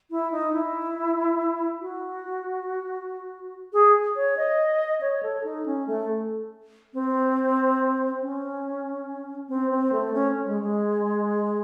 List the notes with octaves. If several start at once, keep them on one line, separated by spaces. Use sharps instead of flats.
E4
D#4
E4
F#4
G#4
C#5
D#5
C#5
A4
D#4
C#4
A3
C4
C#4
C4
C4
A3
C#4
G#3
G#3